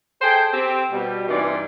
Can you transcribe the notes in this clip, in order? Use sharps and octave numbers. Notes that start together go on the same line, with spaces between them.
G#4 A4 C5 G5
C4 G4
B2 G3
G2 C3 E3 D#4 F4 D5